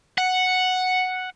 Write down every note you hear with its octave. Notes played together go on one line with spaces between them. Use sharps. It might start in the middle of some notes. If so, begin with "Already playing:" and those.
F#5